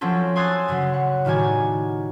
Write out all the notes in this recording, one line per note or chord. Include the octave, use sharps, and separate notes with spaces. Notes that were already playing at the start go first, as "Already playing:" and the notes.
F3 F#3 C4 C#4 A4
G#5 C6 D#6 E6 F#6 A6
F#2 C#3 F#3
F#5
A2 D#3 G3 F#4 G#5